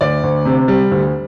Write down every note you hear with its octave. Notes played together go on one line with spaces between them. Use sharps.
D2 D5
D2
C3
G3
D2